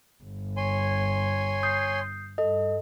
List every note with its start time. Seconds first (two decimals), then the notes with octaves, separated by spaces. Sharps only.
0.23 G1
0.57 C#5 G#5 C6
1.63 D#6 G6 C7
2.38 G2 A4 D#5